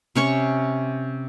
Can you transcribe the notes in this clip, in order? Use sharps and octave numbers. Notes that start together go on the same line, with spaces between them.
C3 C#4 C#5 C#6